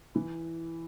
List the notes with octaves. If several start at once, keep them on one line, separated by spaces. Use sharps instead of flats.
E3 E4